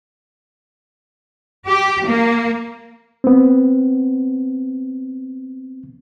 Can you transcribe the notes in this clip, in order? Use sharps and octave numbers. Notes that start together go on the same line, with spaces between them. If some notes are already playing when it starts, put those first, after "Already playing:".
G4
A#3
B3 C4